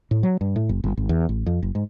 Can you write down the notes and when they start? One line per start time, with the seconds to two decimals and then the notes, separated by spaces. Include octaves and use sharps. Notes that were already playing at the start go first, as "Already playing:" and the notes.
0.11 A2
0.23 F#3
0.41 G2
0.56 A2
0.69 F#1
0.84 G1
0.97 G#1
1.09 E2
1.29 A1
1.46 F2
1.63 F#1
1.75 G#2